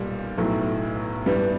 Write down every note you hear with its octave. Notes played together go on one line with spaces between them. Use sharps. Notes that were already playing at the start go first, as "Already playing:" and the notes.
Already playing: B1 A#2 G3
B1 A2 F#3 A3
G2 E3 G3 B3